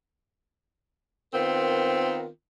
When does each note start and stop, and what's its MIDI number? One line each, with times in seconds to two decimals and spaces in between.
1.33 2.27 51
1.33 2.27 59
1.33 2.27 60
1.33 2.27 65
1.33 2.27 70